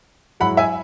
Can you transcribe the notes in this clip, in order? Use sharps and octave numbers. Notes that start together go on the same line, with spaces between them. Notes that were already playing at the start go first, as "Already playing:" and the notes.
G#2 F#3 E4 F#5 B5
E5 G#5